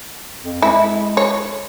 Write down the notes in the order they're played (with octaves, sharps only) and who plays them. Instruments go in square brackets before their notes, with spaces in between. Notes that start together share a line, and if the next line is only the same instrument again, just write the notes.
[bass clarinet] F2
[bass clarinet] G#3 [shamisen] E4
[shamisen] C#5